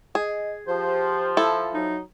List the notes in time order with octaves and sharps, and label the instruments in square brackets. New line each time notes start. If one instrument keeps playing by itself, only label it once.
[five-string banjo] G#4 [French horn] D#5
[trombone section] F3 [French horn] G4 [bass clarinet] C5
[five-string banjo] E4 A4
[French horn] F#3 [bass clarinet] D#4